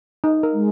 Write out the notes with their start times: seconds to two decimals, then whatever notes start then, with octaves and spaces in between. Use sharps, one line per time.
0.24 D#4
0.43 A#4
0.53 G#3